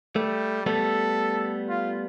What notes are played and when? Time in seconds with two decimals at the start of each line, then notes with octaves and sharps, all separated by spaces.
0.16 G3 A3
0.66 G3 A3 B3 A4
1.68 F4